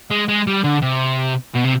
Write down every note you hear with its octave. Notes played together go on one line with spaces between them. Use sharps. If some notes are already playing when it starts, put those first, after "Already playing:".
G#3
G#3
G3
D3
C3
B2
C3